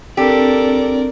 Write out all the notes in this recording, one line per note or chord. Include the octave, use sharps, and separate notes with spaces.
C4 D4 G4 A4 A#4 D5